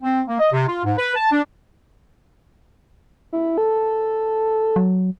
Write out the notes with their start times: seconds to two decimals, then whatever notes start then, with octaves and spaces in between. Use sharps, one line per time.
0.03 C4
0.28 A#3
0.39 D#5
0.52 C3
0.67 F4
0.84 G#2
0.98 B4
1.16 A5
1.32 D4
3.33 E4
3.58 A4
4.76 F#3